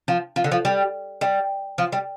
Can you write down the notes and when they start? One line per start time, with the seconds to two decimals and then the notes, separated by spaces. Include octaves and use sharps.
0.08 F3
0.36 F3
0.44 D3
0.52 F3
0.65 G3
1.21 G3
1.78 F3
1.92 G3